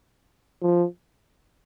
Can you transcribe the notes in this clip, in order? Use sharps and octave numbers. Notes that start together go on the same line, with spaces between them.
F3